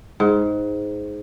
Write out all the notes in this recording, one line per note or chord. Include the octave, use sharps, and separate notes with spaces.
G#2